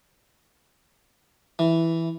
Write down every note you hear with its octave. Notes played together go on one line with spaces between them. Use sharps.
E3